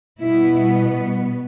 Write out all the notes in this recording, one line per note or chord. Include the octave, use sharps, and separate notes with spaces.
B2 G3 B3 E4